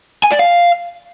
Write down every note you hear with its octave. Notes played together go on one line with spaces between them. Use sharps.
G#5
D5
F5